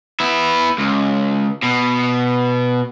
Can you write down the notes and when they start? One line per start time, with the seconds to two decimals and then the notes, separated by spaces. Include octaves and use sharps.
0.20 B3 E4
0.79 C#2
1.63 B2